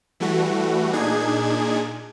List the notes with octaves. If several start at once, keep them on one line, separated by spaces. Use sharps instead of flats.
E3 G3 A3 F#4
A#2 D4 D#4 G#4 G#6